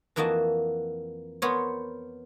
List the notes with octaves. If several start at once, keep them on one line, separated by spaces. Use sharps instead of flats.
F2 E3 A#3 F#4 D#5 A5
B3 A#4 C5 C#5